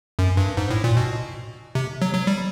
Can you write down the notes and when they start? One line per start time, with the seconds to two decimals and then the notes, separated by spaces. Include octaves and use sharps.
0.19 F#2
0.37 G2
0.57 G#2
0.71 A2
0.84 A#2
0.97 B2
1.75 C3
2.02 F#3
2.14 F#3
2.27 G3